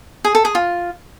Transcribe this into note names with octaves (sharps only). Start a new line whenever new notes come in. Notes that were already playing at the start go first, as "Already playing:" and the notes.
G#4
A4
G#4
F4